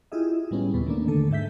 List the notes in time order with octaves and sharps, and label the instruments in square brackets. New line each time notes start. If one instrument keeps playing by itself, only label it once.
[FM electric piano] E4 F4 G4 G#4 D#5 E5
A2 G3 G#3 B3 C#4
D#2 A#2 B3
D#3 A3 A#3 D4
D3 A3 A4
G#2 G#3 E5 G6 B6